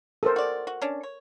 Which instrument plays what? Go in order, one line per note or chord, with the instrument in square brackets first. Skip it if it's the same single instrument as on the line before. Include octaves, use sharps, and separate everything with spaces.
[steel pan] A4 A#4 C5
[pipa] F#4 D5
F#4
C#4 D4
C#5